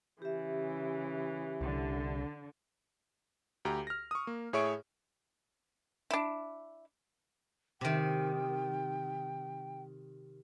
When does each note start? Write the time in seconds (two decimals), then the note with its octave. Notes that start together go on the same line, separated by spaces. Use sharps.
0.22 C#3 E3 G4 E5
1.61 C2 D3
3.65 D2 G4 A#5
3.87 F6 A#6
4.11 C#6 D#6
4.27 A#3
4.53 A2 G#4 C#5 E5 C#6 D7
6.11 D4 E4
7.81 C3 D#3 G5